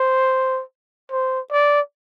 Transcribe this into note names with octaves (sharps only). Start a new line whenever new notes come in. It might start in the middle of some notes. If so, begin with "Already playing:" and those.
Already playing: C5
C5
D5